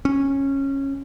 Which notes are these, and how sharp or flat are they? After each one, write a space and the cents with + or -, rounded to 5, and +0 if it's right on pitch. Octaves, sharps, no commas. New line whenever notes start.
C#4 -15